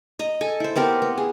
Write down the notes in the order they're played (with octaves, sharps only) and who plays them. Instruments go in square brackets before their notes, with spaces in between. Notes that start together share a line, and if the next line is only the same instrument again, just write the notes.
[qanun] D#5 A#5
A4 G#5
E4 C5
B3 C4 G4 A#4
B3
G#4